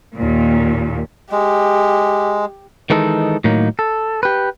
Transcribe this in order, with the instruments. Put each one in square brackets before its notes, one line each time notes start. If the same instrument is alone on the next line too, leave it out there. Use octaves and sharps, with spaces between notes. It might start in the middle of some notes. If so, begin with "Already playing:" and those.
[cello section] D#2 A#2
[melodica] G#3 [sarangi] G4
[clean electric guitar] D#3 E3 G#3 D#4 A4
A2 D#3 F#3 A#3 D#4
A4
G4 B4